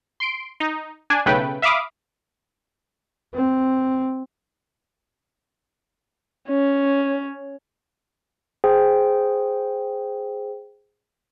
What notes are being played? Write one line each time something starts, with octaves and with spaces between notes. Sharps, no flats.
C6 D7
D#4
D4 G#5
B1 C#3 A3 B4 G5
E5 F5 B5 D6 D#6
C4
C#4
G#4 C5 G5